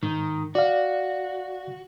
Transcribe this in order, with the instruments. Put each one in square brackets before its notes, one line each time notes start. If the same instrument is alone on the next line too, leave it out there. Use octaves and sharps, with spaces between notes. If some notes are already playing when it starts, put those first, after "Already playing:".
[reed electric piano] G#2 [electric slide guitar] D#3
[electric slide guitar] F#4 [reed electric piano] D5 F5